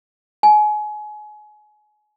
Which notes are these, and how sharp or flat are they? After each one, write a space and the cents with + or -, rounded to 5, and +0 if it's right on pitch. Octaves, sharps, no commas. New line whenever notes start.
G#5 +30